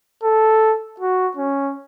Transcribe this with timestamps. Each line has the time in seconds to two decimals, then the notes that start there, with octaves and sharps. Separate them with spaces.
0.24 A4
1.00 F#4
1.37 C#4